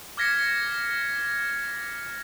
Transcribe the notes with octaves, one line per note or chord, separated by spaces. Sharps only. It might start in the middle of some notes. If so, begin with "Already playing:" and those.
D6 F6 G#6 A#6 B6 C#7